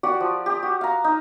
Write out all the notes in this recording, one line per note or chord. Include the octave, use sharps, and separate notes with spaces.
F#4 G4 D5 F#5
F3
G4 D#6
F#4
F5 A#5
D#4